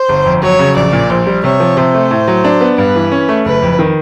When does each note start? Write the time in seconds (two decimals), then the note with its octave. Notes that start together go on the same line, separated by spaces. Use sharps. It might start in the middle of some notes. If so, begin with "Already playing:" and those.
Already playing: C5
0.09 G1
0.25 F2
0.42 F#3 C#5
0.59 C#3
0.76 A#1 D5
0.93 A#2
1.10 A#1 C5
1.27 G3
1.43 C3 C#5
1.60 F3
1.76 C3 C5
1.94 A3
2.11 A2
2.28 F#3
2.44 D4
2.61 B3
2.77 G2 B4
2.95 E3
3.12 C#4
3.28 A3
3.45 F#1 B4
3.62 F2
3.79 D#3